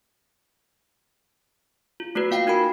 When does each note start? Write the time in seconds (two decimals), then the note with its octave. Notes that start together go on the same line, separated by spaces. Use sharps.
2.00 F4
2.15 A3 F4 F#4 B4
2.31 A#3 F5 G5 C7
2.46 A#3 D#4 F#4 A#4 B5 D7